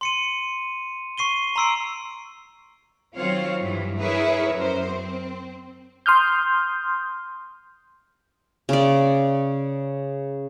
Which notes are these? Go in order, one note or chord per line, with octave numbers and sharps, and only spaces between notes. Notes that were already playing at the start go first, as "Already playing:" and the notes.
C6 C#7 D#7
C#6 C7 D#7 G7
A#5 C6 E6 C7 D7
D#3 F#3 C4 F4 C#5 F5
G2 E3 F#3
E4 G#4 A#4 B4 C#5 E5
F#2 A#4 C5
C4
C6 D#6 F6 G6
C#3 D5